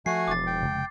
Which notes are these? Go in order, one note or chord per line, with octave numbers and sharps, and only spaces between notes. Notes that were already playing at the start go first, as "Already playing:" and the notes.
F3 A3 F#4 G#5 C7
E1 D6 A6
G5
F1 C#3 G#3